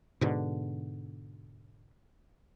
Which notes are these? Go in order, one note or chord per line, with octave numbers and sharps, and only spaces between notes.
G#2 B2 D3